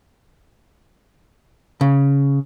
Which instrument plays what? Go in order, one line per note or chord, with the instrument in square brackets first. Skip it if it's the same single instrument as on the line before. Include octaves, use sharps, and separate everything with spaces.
[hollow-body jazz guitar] C#3